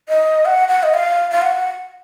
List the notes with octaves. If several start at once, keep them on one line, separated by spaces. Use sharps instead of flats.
D#5
F#5
F#5
D#5
F5
F5
F#5